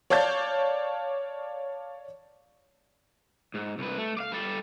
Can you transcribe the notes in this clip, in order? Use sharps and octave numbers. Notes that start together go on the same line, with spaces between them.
C#5 D5 F5 A5 G6 A6
G#2
C2 B4
A3
D5 F5
G3 A4